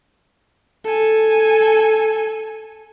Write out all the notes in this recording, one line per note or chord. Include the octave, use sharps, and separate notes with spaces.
A4 G#5